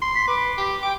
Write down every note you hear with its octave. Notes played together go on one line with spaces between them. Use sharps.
C6
B6
B4 D6
G4
G5 D6